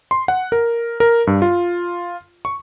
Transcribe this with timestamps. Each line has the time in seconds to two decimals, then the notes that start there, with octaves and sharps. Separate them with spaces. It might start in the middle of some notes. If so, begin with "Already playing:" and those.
0.11 C6
0.28 F#5
0.52 A#4
1.00 A#4
1.27 G2
1.42 F4
2.45 C#6